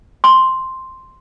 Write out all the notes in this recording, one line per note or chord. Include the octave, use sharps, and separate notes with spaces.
C6